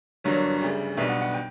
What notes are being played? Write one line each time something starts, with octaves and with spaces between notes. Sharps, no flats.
G1 G2 F#3 A#3 D4 C#5
D2 C#3 G3
B1 B2 G3 B3 D4 E5
F#5
F#5
G5